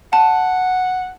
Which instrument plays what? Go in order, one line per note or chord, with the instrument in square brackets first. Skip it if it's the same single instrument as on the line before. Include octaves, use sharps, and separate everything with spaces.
[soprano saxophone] F#5 [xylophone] A5